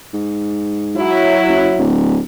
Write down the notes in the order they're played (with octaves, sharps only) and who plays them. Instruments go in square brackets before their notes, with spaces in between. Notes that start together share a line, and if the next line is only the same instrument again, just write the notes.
[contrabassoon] G#2
[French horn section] F#3 E4
[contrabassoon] F#1
D1